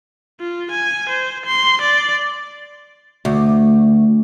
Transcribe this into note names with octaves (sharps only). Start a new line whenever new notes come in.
F4
G#5
C5
C6
D5
D2